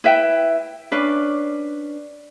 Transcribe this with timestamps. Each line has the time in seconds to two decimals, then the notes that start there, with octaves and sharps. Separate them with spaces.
0.04 E4 B4 E5 G5
0.91 C#4 D4 B4 D5